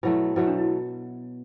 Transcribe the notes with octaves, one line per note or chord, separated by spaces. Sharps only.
B2 F#3 A3 E4
B2 F#3 A3 E4
D4
E4